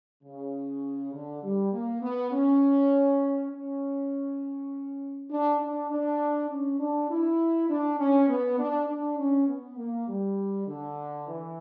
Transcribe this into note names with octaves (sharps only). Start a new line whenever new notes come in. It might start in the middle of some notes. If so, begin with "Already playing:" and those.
C#3
D3
G3
A#3
B3
C#4
C#4
D4
D4
D4
C#4
D4
E4
D4
C#4
B3
D4
D4
C#4
B3
A#3
G3
D3
E3